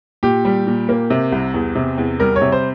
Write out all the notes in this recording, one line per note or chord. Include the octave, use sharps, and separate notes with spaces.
A#2 G4
G3
A#2
A#3
C3
C2
E2
C3
E2
G3 A#4
C#5
C3
C5